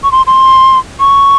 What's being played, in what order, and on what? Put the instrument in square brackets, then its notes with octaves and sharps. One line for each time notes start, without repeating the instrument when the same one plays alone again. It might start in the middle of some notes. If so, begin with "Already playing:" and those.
[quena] C#6
C6
C6
C#6